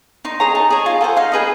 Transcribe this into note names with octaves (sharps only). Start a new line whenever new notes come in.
D#4 C6
G#4 C#5 A#5
D#4 A5
G#4 C#5
F4 G#5
A4 C5 F#5
D#4 F5
G#4 B4 D#5